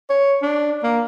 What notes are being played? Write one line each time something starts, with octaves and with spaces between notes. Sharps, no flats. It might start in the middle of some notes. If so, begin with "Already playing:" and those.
C#5
D4
A#3